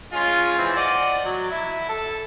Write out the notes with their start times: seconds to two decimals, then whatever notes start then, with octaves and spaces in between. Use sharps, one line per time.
0.13 G#3 C#4 F4
0.58 E3 C4
0.76 D5 D#5 F#5
1.25 F#3
1.51 E4
1.89 A4